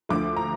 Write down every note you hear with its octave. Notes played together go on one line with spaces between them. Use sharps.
D2 D3 F3 A3 D6
A#5